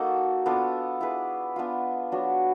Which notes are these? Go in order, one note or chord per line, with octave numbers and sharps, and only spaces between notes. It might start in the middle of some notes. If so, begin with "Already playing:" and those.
Already playing: A#3 D#4 F#4 A4
B3 D4 F4 A4
E4 G#4 B4
B3 D4 F4
F#3 B3 D4 F#4